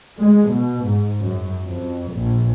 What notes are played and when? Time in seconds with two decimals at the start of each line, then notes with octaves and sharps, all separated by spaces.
0.18 G#3
0.49 B2
0.85 G#2
1.21 F#2
1.66 F2
2.13 A#1